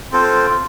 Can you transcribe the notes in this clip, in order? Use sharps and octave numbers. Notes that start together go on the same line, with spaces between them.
C4 F4 A4 C5